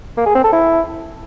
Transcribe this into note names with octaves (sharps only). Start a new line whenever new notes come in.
A#3
G#4
C4
A4
E4